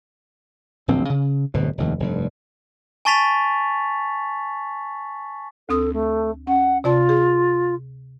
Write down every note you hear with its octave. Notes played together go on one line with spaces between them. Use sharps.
D1 A#1 E2 C4
C#3
D1 G1 B2
F1 D#2 A2
F1 G2
G#5 A5 C#6 A6 B6 F7
D2 C4 A4 D#6
A3
C#4 F#5
C3 F4 D5 A5
G#4